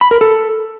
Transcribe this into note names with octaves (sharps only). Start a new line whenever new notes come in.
B5
A#4
A4